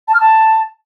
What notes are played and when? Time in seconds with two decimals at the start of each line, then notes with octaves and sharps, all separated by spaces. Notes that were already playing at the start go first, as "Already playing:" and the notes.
0.08 A5
0.14 F6
0.20 A5